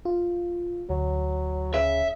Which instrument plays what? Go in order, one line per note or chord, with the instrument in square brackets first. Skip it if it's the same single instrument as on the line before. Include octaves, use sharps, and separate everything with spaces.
[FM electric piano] F4
[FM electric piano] D2 [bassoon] F#3
[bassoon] C#3 [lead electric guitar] E5